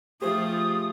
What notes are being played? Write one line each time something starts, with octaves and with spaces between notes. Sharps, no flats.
F3 A3 F4 G4 G#4 C5 D#6